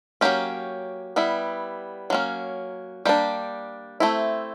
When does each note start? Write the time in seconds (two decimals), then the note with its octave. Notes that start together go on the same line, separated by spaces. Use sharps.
0.21 F#3 A#3 C#4 G4
1.16 G3 B3 E4
2.10 F#3 A#3 C#4
3.05 G3 A#3 D4 G4
4.00 A3 C4 E4